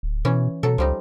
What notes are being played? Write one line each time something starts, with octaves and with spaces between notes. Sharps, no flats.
D1
B2 E3 C#4
B2 F#3 A4
C#2 F3 G3 D#4